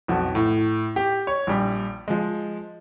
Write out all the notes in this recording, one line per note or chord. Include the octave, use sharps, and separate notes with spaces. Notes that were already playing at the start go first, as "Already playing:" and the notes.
B1 F2 F#4
A2
G4
C#5
A#1 G3
F3 G#3